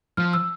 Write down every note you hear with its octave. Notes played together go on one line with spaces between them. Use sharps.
F3 F6
E6